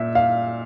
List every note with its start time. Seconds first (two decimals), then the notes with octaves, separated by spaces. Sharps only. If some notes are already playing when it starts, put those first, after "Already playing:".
Already playing: A#2 E5
0.15 F5